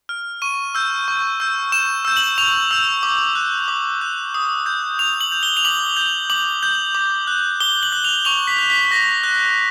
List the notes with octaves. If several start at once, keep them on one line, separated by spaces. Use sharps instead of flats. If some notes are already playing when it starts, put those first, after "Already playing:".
F6
C#6 D#7
E6 G6
C#6
E6 G6
C#6 E7
E6 G6
F#7
C#6 F7
E6 G6
D6
F#6
D6
F#6
D#6
G6
D#6 F7
F#7
G6
G7
F7
D6 F#7
G6
D6 F#7
G6
D6
F#6
D6 G7
F#7
F#6
F7
C#6 F7
B6
F#6
B6
C#6 A#6
F#6